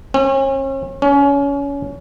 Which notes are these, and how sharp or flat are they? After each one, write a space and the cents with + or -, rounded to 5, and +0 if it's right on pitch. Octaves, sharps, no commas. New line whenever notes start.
C#4 -40
C#4 +25